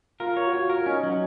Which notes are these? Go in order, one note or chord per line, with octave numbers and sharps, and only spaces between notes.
F4 A#4
C#5
F#4
F4 C#5
A#4
C#4 D#4
F#3